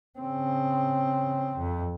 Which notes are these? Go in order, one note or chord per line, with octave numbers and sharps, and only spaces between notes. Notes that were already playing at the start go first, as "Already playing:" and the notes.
C#3 C4
F2